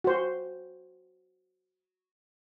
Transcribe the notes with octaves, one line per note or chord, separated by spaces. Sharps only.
F#4 C5